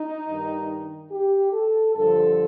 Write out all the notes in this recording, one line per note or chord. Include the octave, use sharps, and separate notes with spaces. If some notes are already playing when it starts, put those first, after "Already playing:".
Already playing: D#4
G2 D#3
G4
A4
G2 D3 F3 A4